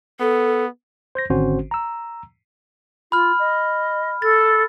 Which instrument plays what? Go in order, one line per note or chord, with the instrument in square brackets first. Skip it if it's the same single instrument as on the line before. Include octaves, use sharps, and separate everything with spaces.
[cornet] B3 [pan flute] A4
[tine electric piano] C5 G6 A#6
G#1 D3 C4 C#4 F#4 C5
A#5 E6
[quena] F4 [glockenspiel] B5 F6
[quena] D#5
[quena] A4 [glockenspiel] A6